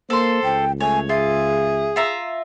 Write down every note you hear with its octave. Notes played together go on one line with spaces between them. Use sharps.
A#3 A4 C5 C6
C#2 G5
A3 C#5 G#5
F4 G#4 E5
F4 E5 A#5